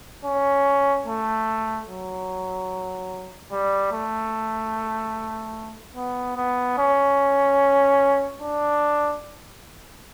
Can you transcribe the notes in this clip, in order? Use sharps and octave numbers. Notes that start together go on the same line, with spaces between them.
C#4
A3
F#3
G3
A3
B3
B3
C#4
D4